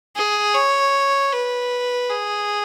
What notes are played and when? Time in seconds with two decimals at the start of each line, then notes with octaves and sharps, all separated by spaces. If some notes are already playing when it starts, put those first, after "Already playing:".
0.16 G#4
0.54 C#5
1.33 B4
2.10 G#4